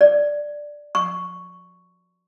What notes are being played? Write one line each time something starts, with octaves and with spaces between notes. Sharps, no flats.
D5
C#6